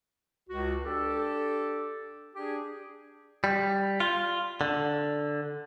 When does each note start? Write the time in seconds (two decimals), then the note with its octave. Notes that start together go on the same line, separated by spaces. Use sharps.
0.50 C#2 F#4
0.84 D4 G4 A4
2.35 D4 G4 G#4
3.44 G3
4.00 F4
4.61 D3